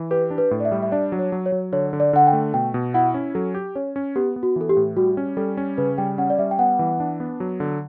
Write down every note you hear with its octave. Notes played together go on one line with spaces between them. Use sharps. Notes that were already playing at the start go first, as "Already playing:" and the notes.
Already playing: E3
G4 B4
D4
B4
A2
D5
E5
G3
E5
D4 D5
F#3
C#5
F#3
C#5
F#3
D3 C#5
D3
D5
D3 F#5
G5
A3
B2 G5
B2
E4 F#5
C#4
F#3 A4
G4
C#4 C#5
C#4
B3 G4
B3
F#4
E3 A4
G4
A2
G3 F#4
C#4
G3 A4
C#4
C#3 B4
G3 G5
C#4 F#5
D5
G3 E5
G5
B3 F#5
E3
D4
B3
F#3
D3